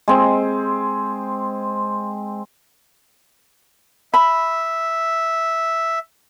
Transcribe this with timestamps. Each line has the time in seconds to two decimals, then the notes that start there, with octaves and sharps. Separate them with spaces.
0.08 G#3 C4
4.14 E5 B5